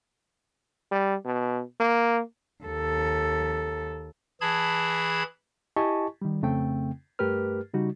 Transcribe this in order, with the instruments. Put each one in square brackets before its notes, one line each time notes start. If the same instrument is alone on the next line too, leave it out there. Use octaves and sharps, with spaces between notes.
[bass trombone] G3
B2
A#3
[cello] D#2 A4
[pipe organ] E3 G#4 A5 B5 G#6
[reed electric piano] E4 G4 D#5 G#5 A5 C#6
D#3 G3
F2 C#3 A3 C4 G5
G2 A3 G4 A#4 B4 F6
C#3 G3 D#4 F#4